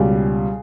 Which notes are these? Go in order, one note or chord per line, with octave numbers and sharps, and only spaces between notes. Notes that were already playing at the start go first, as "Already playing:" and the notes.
Already playing: C#2 B2 G3 G#4